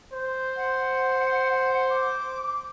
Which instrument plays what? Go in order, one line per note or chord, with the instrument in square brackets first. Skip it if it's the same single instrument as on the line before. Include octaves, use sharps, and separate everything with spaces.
[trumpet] C5
[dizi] F#5
D6